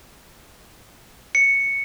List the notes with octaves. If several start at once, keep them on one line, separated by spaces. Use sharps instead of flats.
C#7